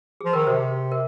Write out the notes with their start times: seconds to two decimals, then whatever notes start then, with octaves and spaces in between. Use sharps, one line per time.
0.21 F3 G#4
0.33 D#3 A#4
0.47 C3 C5
0.92 A#4